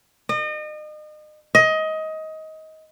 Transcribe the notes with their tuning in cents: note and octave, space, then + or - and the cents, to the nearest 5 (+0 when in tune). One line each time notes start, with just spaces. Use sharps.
D#5 -35
D#5 +20